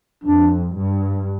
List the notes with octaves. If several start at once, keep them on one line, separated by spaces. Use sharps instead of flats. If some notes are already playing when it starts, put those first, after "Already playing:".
F2 D4
G2